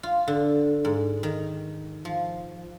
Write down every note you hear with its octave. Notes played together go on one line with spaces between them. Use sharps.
F4
D3
G#2
D#3
F3